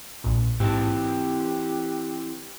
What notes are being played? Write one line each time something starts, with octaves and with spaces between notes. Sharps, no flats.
A#1 A#2
G#2 E3 C4 G4 A5